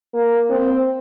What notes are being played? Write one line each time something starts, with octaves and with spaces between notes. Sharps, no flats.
A#3
C4